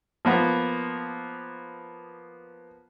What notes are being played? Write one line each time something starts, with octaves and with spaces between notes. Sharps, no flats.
F3 A#3 B3